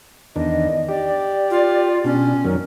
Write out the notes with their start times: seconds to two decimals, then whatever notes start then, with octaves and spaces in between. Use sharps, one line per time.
0.36 E2 D#3 D4 D#5
0.89 G4 D5
1.50 F4
2.04 B2 C#4 D4
2.45 F#2 D#3 F#3 A#4